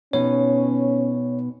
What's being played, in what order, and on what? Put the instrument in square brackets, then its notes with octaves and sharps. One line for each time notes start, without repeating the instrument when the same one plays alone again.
[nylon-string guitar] B2 B3 D#4 [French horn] C#4 [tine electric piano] C#5